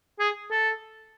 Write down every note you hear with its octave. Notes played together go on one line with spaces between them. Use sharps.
G#4
A4